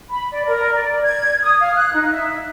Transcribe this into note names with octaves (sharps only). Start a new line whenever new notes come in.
B5
D5
A#4
D5
G#6
D#6
F5
F#6
D#4
E5